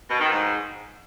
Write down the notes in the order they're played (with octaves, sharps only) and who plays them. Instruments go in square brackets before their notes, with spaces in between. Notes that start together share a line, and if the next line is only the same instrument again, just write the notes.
[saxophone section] B2
D#3
G#2